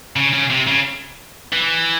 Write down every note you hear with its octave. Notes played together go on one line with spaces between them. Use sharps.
C#3
C#3
C3
C#3
E3